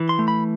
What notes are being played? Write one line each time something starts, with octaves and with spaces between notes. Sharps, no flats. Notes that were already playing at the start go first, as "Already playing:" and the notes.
Already playing: E3
C6
A3
B5